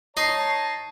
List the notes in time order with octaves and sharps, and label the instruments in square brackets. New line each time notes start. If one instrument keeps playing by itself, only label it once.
[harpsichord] D#4 D#5 [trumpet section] C#5 A5 [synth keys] C7